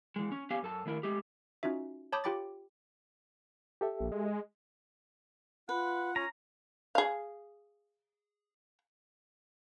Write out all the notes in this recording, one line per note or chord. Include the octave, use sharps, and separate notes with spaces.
E3 G#3
C#4
B3 C#4 G4 F5 G#5
F#2 A4 A5
D#3 A3 E4 A#4
G#3 A3 G4
C#4 D#4 F4 F#4 E5
C#5 A5 B5 D6 D#6 G6
F4 G4 G5 B5 D6 A6
G4 A4 E5
A#1
G#3
F4 B4 F#5
C#4 A#5
G#4 F5